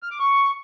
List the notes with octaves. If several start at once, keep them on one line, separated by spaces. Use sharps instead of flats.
F6
D6
C#6